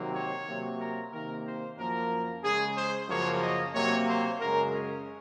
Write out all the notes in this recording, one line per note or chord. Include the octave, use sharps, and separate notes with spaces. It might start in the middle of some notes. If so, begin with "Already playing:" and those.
Already playing: C3 D#3 F#3 A#3
C#5
C3 F#3 A#3
A#4
C3 D#3 A#3 A#4
C5
F#2 F3 A#3 A#4
C#3 G#3 G#4
C5
F#2 C#3 F3 A#3 C#5
D#5
C3 F#3 A#3 C#5
C5
F#2 C#3 G#3 A#4
C#4